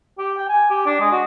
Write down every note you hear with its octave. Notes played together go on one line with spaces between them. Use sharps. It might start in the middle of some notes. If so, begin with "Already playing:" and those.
G4
G5
G#5
G4
D4
G#3
F#4